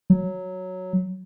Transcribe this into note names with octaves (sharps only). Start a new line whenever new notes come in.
F#3